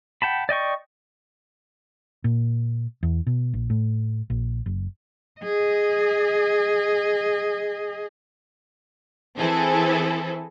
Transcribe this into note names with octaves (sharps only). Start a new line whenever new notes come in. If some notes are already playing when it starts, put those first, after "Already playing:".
F#5 G5 A5 B5
D5 D#5 G5 C#6
A#2
E2
B2
A#1
A2
A#1
F#1
G#4 D#5
E3 C4 E4 G#4 A4